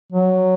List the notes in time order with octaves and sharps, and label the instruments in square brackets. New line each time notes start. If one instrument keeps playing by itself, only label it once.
[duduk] F#3